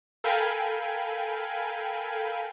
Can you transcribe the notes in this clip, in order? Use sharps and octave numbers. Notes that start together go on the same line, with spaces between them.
A4 A#4 F5 G5 G#5 B5